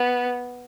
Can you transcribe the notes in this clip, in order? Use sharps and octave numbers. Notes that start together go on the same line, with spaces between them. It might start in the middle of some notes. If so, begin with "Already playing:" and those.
Already playing: B3